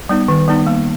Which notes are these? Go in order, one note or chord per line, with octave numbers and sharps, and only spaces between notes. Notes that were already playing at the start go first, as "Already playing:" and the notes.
G3 B3 D#4
D#3
G3 B3 D#4
A#3